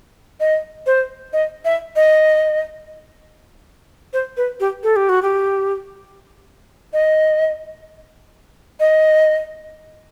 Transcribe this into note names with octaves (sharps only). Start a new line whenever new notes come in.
D#5
C5
D#5
E5
D#5
C5
B4
G4
A4
G4
F#4
G4
D#5
D#5